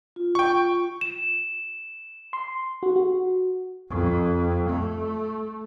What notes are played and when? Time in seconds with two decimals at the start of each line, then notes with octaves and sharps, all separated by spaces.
0.16 F4
0.35 G5 C#6
1.01 E7
2.33 C6
2.83 F#4
2.96 F#4
3.89 F2
4.69 A3